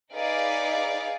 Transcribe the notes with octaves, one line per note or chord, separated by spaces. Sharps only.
D#4 G#4 B4 D5 F5